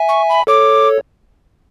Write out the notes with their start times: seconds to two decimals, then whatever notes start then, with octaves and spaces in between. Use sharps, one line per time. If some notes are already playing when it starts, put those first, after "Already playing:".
Already playing: E5 G#5
0.09 C#6
0.29 B5
0.47 A4 C#5 D6